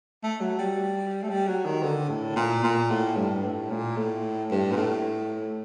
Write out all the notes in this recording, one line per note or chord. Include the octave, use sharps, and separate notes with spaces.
A3
F#3
G3
A3
G3
F#3
D#3
D3
A2
A#2
A#2
A2
G2
A2
A#2
A2
G2
A#2
A2